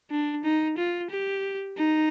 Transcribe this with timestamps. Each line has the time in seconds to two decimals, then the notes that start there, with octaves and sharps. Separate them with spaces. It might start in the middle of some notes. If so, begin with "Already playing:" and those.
0.11 D4
0.44 D#4
0.78 F4
1.10 G4
1.77 D#4